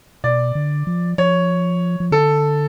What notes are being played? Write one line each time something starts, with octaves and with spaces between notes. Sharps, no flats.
B2 D5
D3
F3
F3 C#5
F3
D3 A4